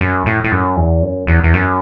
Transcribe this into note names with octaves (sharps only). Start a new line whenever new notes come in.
F#2
A2
A2
F#2
E2
F#2
E2
E2
F#2